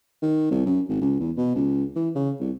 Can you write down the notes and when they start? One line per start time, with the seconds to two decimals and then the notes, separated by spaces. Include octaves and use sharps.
0.22 D#3
0.51 C2
0.66 F#2
0.89 G#1
1.01 C#2
1.20 E2
1.37 B2
1.55 C#2
1.96 E3
2.15 C#3
2.40 C2